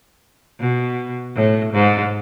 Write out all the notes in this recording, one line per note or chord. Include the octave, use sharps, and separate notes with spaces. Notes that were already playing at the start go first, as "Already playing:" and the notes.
B2
A2
G#2